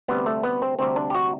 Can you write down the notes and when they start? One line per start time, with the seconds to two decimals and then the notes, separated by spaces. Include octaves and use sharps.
0.08 D2 C3 G3 B3
0.26 A3
0.43 B3
0.62 C4
0.79 D2 C3 G3 C4
0.96 D4
1.10 G4
1.15 F#4